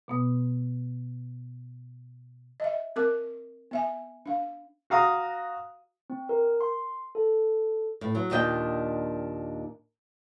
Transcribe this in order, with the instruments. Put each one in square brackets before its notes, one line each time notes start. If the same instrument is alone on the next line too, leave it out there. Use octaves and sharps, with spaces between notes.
[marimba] B2 B3 D#6
[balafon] D#5 E5
C4 A#4 D6
B3 E5 G#5
D4 F5
[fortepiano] F#4 F5 A#5 D#6
[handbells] C4
A#4
C6
A4
[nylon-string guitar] A2
F#3
D#2 A#2 D4 D#4 D#5 G5